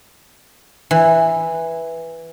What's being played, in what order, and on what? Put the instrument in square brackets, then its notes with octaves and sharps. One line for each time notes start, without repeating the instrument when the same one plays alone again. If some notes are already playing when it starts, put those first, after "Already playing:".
[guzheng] E3